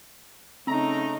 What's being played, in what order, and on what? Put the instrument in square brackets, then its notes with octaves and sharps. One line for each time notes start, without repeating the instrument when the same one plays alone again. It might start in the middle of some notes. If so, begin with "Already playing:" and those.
[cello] C#3 D#4 [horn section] A3 A#5 [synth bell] C4